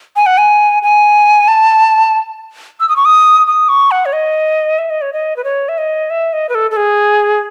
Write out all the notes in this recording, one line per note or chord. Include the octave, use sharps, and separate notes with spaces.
G#5
F#5
G#5
G#5
A5
E6
D#6
C#6
D#6
D#6
C#6
F#5
C#5
D#5
E5
D#5
C#5
D#5
B4
C#5
E5
D#5
E5
D#5
B4
A4
A4
G#4